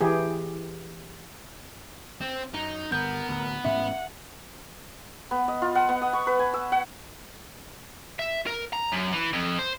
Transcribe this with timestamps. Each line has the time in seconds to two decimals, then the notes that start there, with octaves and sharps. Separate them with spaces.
0.01 E3 G4 G#4
2.21 C4
2.54 F#2 D#4
2.92 G1 B3 A#4 G6
3.28 D1 D2
3.65 A1 G#2 C#4 E5 F#5
5.31 B3
5.48 D#5
5.62 F4
5.75 F#5
5.89 B3
6.02 D#6
6.13 C#6
6.27 B4
6.39 G#5
6.54 E6
6.72 F#5
8.19 E5
8.47 A#4
8.73 A#5
8.92 F#2
9.13 E3
9.33 F2
9.59 C5